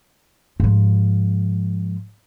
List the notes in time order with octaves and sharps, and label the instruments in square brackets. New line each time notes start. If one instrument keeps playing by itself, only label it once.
[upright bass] G#2 F3